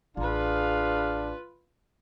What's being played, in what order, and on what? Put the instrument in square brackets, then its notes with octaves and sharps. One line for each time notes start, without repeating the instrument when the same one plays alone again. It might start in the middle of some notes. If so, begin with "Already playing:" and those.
[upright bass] A1 [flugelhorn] D4 [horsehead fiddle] F4 B4 [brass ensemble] G#4 F5